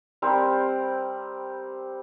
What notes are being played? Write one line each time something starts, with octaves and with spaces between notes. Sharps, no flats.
G3 C4 A#4 C5